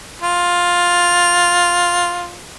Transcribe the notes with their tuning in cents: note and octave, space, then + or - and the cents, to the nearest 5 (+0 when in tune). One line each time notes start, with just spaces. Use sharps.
F4 +10